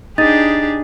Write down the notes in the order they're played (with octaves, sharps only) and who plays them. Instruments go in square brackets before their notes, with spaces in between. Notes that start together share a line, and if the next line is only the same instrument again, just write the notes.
[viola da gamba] D4 G4 G#4 [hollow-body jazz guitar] D#4 [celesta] A6